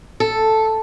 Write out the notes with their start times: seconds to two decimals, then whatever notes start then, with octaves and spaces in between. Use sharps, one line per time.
0.20 A4